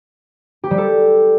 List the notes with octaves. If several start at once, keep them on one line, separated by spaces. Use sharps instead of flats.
G4
G3
A4